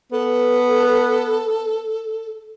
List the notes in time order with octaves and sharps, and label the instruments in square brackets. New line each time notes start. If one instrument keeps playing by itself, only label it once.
[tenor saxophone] B3 [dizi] A4 [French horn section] B4